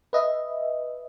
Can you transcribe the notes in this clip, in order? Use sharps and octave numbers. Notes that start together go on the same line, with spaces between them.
B4 D#5 E5